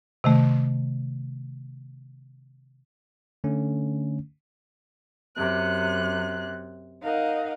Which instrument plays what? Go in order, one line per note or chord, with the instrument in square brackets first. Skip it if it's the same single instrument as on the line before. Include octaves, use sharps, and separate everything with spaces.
[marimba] C3 D#3 A3
[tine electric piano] D3 A3 C#4
[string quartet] F#2 C3 F#6
D#4 A#4 D#5 F5 F#5